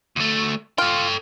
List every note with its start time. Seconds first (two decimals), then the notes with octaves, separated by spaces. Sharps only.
0.16 D2 A3
0.78 F4 A4 G5